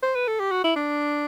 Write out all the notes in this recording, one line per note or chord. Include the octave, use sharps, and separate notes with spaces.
C5
B4
A4
G4
F#4
E4
D4